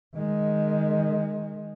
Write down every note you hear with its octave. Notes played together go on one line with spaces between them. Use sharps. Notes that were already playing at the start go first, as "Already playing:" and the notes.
D#3 G#3